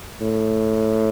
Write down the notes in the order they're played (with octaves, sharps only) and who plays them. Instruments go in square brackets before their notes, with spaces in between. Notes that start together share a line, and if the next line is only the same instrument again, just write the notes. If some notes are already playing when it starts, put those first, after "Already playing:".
[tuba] A2